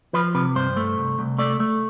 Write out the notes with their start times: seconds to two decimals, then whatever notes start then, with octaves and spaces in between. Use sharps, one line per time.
0.13 F3 B4
0.35 C3 B4
0.55 G2 C5
0.77 A3
0.98 C2
1.19 C2
1.38 A3 D5
1.60 A3